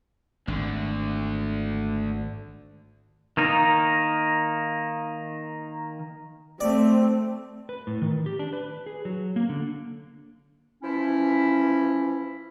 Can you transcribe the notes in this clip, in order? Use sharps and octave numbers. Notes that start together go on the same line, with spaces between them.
G#1 D2 D3
D#3 A#3 D#4
A3 C4 D5
B4
A2
D#3
G4
D4
B4
G#4
F#3
A#3
D3
E3 F3 C#4 E4